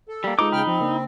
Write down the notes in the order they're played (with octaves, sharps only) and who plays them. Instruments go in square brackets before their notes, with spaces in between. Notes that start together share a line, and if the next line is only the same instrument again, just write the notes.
[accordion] A4
[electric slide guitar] G3 A#3
[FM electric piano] G#3 F4 B4 [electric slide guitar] D#4 [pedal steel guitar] D6
[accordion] C#3 G5 F6 [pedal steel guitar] B5
[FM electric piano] F3 [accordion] C4
[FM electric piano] C#3 A#3 D4